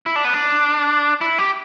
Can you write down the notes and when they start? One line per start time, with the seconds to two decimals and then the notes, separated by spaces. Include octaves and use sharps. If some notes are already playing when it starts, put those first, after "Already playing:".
0.06 E4
0.16 D4
0.25 B3
0.34 D4
1.21 E4
1.38 G4